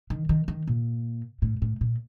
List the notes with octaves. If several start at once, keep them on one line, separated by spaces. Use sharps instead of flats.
D#3
D#3
D#3
A#2
A2
A2
A#2